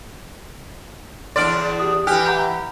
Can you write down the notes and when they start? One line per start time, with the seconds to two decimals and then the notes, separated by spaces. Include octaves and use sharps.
1.36 E2 D4 D5 C6 F6 D7
1.79 G4 D#6
2.07 E3 G4 G#5 F6 F#6
2.26 F#5 A#5 G6